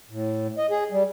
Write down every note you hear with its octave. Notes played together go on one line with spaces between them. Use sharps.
A2
D#5
G#4
G3